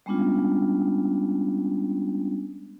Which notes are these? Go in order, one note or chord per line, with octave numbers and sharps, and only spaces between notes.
G3 G#3 B3 C#4 D4 F4